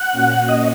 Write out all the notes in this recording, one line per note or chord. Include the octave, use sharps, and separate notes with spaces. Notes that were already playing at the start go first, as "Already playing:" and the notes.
Already playing: F#5
A#2 A#3 C#4 F#4
D#5